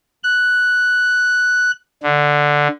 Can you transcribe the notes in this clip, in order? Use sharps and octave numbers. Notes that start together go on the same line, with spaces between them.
F#6
D3